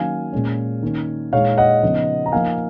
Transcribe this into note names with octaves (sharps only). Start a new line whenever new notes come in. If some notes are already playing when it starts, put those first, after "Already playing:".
Already playing: D#3 F#3 A#3 C#4 F5 G#5
A#2 G#3 C#4
D#3 A#3 C#4
A#2 G#3 D#4 C#5 F5
D#5 F#5
C#3 F3 B3 D#4
A#5
F3 A#3 D#4 F5 G#5